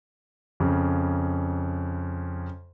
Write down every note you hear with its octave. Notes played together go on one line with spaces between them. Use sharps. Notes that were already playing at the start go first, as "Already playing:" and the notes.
F2 C#3